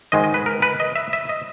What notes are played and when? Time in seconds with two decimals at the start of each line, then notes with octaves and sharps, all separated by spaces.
0.12 G#2 D#3 G#3 D#5
0.24 D#5
0.34 B4
0.46 A#4
0.62 B4
0.80 D#5
0.96 E5
1.13 E5
1.29 D#5